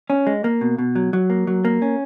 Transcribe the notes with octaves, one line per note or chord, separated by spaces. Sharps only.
C#4
G#3
A#3
B2
B2
F#3
F#3
A#3
F#3
A#3
C#4